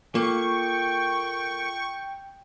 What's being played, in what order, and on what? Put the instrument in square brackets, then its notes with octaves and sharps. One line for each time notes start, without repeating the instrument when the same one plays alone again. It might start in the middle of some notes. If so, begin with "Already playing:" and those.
[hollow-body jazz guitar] A#3 [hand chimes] F4 A4 [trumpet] G5 [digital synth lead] C#6